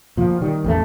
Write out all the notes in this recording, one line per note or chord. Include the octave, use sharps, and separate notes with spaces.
A#2 F3
D#3 G3
A1 E2 A3